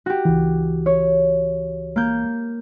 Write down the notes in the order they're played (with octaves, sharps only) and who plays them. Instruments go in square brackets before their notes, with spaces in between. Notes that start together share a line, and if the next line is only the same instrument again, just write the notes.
[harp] F#4 G4
[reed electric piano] C#2 E3
[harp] C#5
A#3 G6